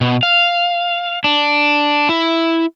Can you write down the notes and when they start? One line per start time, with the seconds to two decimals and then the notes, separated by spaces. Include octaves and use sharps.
0.01 B2
0.23 F5
1.24 D4
2.09 E4